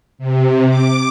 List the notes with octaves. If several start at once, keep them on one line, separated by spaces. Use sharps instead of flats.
C3
D6